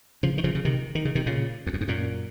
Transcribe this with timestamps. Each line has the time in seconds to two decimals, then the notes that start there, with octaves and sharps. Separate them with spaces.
0.23 C#3 F3
0.38 D#3
0.44 C#3 F3
0.55 C#3
0.65 C3 D#3
0.95 D#3
1.05 C#3
1.15 C3 D#3
1.26 A#2 C#3
1.67 F2
1.74 F#2
1.81 G#2
1.88 F#2 A#2